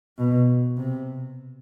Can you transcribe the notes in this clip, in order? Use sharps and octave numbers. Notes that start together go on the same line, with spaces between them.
B2
C3